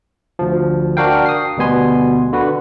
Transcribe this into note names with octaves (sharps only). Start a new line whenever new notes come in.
D2 F3
D4 F#4 A#4 F5 G5
D#6 C7
D2 B2 G3 B3 G#5 C6
D3 F#4 B4